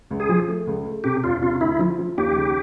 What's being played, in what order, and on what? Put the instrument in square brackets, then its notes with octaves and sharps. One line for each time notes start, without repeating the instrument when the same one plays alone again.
[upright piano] C#2
[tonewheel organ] G#4
[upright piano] F3
A3
C#2
A3
[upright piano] C3 [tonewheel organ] G4
[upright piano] E1 [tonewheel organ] F4
[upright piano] C3 [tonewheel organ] F4
[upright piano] D2 [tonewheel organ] E4
[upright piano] F3
F3
[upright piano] D#2 [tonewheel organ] G4
[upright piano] C#3